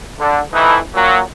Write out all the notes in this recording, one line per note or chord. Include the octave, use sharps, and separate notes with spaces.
D3
F2 E3 A3 D#4 E4 B4
A#2 F#3